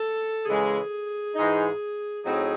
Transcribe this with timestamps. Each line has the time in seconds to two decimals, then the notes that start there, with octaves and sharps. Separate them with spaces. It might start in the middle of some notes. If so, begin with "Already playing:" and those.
Already playing: A4
0.46 C#3 E3 G#3 G#4
1.35 G#2 E3 G#3 D#4
2.25 A2 F#3 C4 D#4 G#4